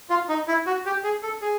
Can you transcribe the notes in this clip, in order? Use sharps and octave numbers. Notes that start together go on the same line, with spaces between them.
F4
D#4
E4
F#4
G4
G#4
A4
G#4